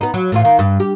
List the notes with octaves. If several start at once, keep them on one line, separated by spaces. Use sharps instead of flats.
B3 D#4
F#3
A2 E3 F4
D#3
G2
G4